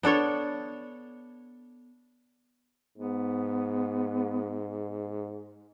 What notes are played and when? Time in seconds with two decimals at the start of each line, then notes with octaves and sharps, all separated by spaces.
0.03 B3 D4 A4 C#5
2.98 G#2 B3